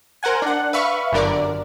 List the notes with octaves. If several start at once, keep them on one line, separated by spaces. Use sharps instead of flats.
A#4 C5 F#5 G#5
D4 F#5
B4 E5 F5 B5 C#6
G1 F#2 D3 A#4 D5